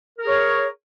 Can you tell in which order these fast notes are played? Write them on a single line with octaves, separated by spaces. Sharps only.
A#4 G#4 C#5